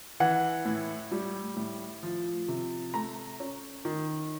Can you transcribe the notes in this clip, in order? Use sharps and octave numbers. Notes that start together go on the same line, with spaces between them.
E3 F#5
A2
G3
A2
F3
C3
A3 A#5
C#4
D#3